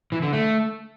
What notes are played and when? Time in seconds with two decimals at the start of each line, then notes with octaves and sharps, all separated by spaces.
0.12 E3
0.22 D3
0.33 A3